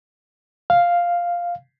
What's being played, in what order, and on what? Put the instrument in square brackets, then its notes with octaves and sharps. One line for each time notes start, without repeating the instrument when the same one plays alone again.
[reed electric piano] F5